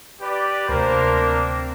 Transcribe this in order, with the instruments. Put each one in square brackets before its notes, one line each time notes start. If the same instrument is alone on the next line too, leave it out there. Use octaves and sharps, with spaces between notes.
[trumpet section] G4 B4 D5
[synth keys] D2 C3 [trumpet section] A#3 D4 A#4 [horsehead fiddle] C5
[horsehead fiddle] C4